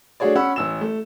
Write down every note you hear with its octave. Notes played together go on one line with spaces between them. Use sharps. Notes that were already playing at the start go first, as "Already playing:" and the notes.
A3 D4 F#4 G#4 C#5 D5
C#4 F#5 B5 E6
A1 E6 E7
A3